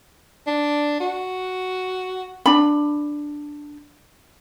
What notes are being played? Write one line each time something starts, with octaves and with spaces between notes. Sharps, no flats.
D4
F#4
D4 B5